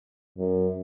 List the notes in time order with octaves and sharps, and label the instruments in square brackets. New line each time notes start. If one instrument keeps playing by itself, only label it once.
[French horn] F#2